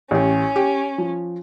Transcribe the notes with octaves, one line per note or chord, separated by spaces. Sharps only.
A1 C#4 G4
G4
F3